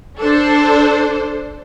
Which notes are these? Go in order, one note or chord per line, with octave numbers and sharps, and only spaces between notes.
D4 A4 C5